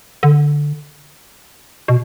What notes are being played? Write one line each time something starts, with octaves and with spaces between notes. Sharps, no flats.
D3
B2